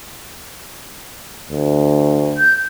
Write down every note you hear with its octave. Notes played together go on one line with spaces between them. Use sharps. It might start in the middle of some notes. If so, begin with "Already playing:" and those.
D2
G6